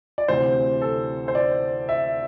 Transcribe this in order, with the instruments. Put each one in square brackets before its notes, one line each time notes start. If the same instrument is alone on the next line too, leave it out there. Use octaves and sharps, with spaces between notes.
[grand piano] D5
D2 C3 E3 C5
A4
C5
D5
E5